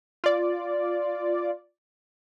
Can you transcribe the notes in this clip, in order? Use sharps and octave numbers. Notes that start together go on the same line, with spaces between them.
F4 D5